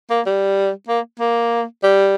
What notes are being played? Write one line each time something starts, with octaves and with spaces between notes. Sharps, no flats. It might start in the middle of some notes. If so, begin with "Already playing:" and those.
A#3
G3
A#3
A#3
G3